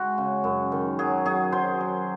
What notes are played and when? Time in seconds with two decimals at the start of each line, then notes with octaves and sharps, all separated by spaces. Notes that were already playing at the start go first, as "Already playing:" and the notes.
Already playing: G#3 F#4
0.18 C#3
0.44 F#2
0.72 D#3
0.99 F#3 G#4
1.25 F#3 G#4
1.52 F#3 C5
1.81 F#3